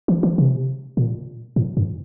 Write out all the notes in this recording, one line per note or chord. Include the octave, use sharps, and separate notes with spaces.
E3
E3
C3
A#2
A2
G2